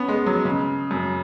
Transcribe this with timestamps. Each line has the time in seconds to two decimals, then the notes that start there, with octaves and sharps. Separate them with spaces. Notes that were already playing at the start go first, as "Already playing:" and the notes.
Already playing: B3 C#4
0.08 G#3
0.26 F#3
0.45 C#3
0.91 F#2